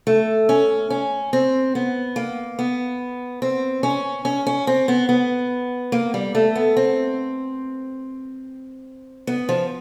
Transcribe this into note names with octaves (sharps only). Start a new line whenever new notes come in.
A3
C#4
C#4
C4
B3
A#3
B3
C4
C#4
C#4
C#4
C4
B3
B3
A#3
G3
A3
B3
C4
B3
F3